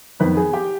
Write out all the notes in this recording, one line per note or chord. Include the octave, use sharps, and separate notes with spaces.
F2 D#3 B3 B4 B5
G#4 G#5
G4 G5